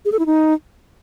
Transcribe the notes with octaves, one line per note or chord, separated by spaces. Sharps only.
G#4
A4
E4
D#4